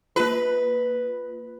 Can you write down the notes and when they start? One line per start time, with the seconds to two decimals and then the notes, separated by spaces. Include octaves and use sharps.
0.16 A#3 F4 B4